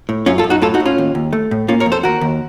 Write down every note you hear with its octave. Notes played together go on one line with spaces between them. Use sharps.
A2
F#2 C#4 F4
F4 A4
F#2
D#4 F#4
A2 F4 A4
D#4 F#4
A2
C#4 F4
D#2
D#2
A3
A2
A#3 C#4 F4
A#4 C#5
F2
A4 C5
D#2 F#4 A#4
D#2